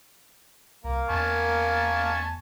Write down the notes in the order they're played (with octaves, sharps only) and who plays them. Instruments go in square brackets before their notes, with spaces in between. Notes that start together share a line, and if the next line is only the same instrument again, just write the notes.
[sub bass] C2 [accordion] A#3 A#4
[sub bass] E2 [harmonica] G#5 A5 C#6